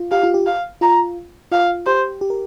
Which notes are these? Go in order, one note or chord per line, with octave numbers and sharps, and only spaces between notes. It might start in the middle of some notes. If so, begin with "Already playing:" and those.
Already playing: F4
G4 F5
F4
G4
F5
F4 A#5
F4 F5
G4 C5
G4
A#4